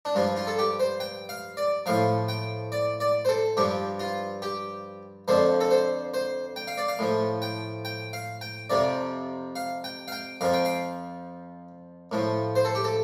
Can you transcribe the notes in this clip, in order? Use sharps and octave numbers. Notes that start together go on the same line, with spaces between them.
D4
G2 F3 F4
F4
A4
G4
C5
G5
F5
D5
A2 F3 F5
G5
D5
D5
C5
A4
G2 F3 G4
F4
G4
F2 D3 F3 C5
A4
C5
C5
G5
F5
D5
F5
A2 F3
G5
G5
F5
G5
F2 C3 F3 D5
F5
G5
F5
G5
F2 F3 F5
G5
F5
A2 F3
C5
A4
G4
A4